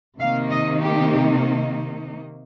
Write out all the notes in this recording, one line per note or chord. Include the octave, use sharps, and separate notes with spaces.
C3 D#3 A#3 D#4 F5
D#5
G4